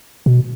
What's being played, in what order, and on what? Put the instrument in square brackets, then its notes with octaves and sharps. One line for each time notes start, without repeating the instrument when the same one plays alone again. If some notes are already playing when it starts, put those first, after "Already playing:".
[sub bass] B2